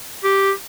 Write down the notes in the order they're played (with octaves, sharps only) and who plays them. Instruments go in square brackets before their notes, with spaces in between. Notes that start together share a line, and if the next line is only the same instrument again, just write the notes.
[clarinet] G4